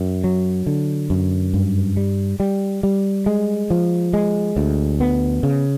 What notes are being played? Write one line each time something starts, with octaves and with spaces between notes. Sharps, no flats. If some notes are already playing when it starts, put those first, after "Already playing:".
Already playing: F#2
F#3
D3
F#2
G2
G3
G3
G3
G#3
F3
G#3
D2
B3
C#3